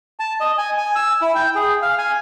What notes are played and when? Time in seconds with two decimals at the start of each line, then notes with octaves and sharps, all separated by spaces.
0.20 A5
0.40 D#5
0.58 G#5
0.78 G#5
0.96 E6
1.22 E4
1.35 G5
1.56 G#4
1.82 F5
1.98 G#5